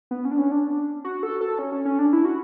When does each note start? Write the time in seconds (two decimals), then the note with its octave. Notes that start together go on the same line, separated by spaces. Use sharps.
0.11 B3
0.25 C#4
0.31 D4
0.38 C#4
0.51 D4
1.04 F#4
1.23 A4
1.41 A4
1.59 C#4
1.72 C#4
1.85 C#4
1.99 D4
2.13 E4
2.25 F#4